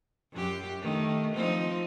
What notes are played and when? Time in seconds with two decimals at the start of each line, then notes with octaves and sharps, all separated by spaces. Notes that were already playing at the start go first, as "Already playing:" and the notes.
0.33 F#2 G4
0.82 D#3 A3
1.35 F3 C4 D#4